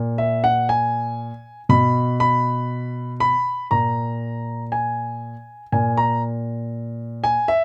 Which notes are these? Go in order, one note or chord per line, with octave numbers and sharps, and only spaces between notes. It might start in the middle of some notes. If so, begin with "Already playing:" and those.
Already playing: A#2
E5
F#5
G#5
B2 B5
B5
B5
A#2 A#5
G#5
A#2 G#5
A#5
G#5
E5